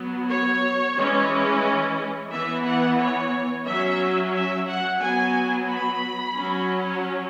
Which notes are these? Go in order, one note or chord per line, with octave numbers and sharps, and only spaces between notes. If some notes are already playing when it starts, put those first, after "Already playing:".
Already playing: F#3 B3
C#5
E3 G#3 C#4
E3 B3 E5
F#5
C#5
F#3 C#4 E5
E5
F#5
F#3 B3 G#5
B5
F#3 C#4